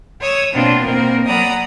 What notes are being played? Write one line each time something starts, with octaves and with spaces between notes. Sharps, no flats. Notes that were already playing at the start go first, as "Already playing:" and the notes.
C#5 D#6 E6
B2 A#3 C4 D4 F4
B2 A#3 C4 A#4
F#3 D5 F#5 A#5 B5 D#6